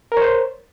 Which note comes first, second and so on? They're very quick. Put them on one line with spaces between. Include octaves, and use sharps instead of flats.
A#4 C#5 C5